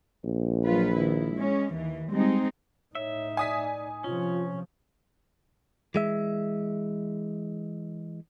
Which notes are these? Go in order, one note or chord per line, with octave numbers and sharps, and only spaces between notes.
A#1
F#3 F4 B4
D#3 E4
G#3 C#4
D#2 E3
G3 G#3 C4 D#4
A2 D#4 C#5 E5
D5 G#5 D#6 B6
C3 F3 C#4 F4
E3 G#3 E5